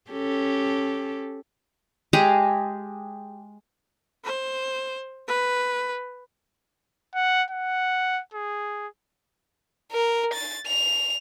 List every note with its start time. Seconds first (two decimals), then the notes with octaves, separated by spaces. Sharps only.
0.11 C#4 G4 A4
2.13 G#3 G4 G#4 A#5
4.24 C5
5.28 B4
7.15 F#5
7.50 F#5
8.34 G#4
9.92 A#4
10.34 A6
10.67 F7